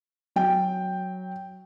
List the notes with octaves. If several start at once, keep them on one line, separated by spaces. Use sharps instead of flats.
F#3 G5